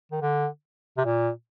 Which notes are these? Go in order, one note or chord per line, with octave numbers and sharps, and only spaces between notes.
D#3
D3
C3
A#2